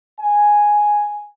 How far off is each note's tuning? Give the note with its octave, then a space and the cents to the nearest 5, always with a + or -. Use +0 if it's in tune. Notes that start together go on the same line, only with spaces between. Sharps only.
G#5 +0